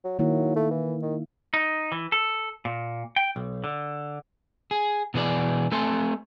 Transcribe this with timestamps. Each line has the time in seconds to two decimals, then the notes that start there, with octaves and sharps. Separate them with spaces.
0.04 F#3
0.19 D#3 F#3 A#3 E4
0.56 A3
0.70 E3
1.02 D#3
1.54 D#4
1.92 E3
2.12 A4
2.65 A#2
3.16 G5
3.36 B1
3.64 D3
4.71 G#4
5.14 B2 E3 G#4 D5
5.72 A3 C4 A4 G#5 A5 C6